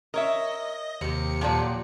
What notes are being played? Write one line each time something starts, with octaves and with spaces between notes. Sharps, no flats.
A#4 C#5 D#5 E5
D#2 C3 G4 C#7
A#2 F3 F#3 G4 A4 D5